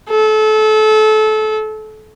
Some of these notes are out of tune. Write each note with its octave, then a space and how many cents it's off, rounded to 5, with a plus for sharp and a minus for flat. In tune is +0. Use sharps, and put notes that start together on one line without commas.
A4 -30